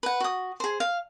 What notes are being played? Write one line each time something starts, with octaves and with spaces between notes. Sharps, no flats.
B4 F#5
F#4 D#6
G#4 C5
F5